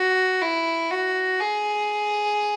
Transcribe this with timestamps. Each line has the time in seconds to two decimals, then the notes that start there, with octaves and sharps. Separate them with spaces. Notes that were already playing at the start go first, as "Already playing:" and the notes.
Already playing: F#4
0.41 E4
0.91 F#4
1.41 G#4